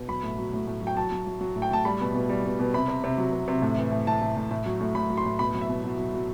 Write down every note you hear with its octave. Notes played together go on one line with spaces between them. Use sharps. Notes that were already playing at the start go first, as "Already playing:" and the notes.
Already playing: B2
F#3 B5
A2
F#3
A2
A2
F#3 G5
F#3 A5
F#3
F#3
F#3
A2
G5
A2 A5
G3 B5
B2
B2
G3
B2
B2
C3 B5
C3
C3
F#3
C3
C3
A2
E3
A2
A2 A5
A2
A2
A2
F#3
A2
A2 B5
F#3
C6
A2
B2 B5
F#3
E5
B2
F#3
F#3
F#3